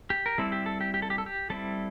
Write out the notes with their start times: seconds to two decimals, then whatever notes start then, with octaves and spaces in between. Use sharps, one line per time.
0.10 G4
0.26 A#4
0.38 G3 C4 E4 A4
0.52 G4
0.66 A4
0.81 G4
0.94 G4
1.02 A4
1.10 G4
1.18 A4
1.26 G4
1.50 G3 C4 E4 A4